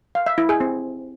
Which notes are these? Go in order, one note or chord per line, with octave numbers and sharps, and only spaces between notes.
F5
E5
E4
G#4
C4